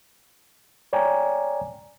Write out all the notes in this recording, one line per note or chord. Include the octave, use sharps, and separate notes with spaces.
C#5 D5 G5 G#5 A#5